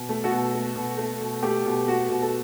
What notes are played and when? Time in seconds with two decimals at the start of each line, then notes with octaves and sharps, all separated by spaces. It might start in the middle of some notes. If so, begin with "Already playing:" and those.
Already playing: B2
0.09 A3
0.24 F#4 A4
0.31 B2
0.53 A3
0.76 B2
0.97 A3
1.21 B2
1.42 A3 G4
1.65 B2
1.87 A3 F#4
2.10 B2
2.22 A4